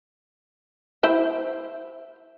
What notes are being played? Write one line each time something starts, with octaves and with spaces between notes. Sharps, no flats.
E4 C5 E5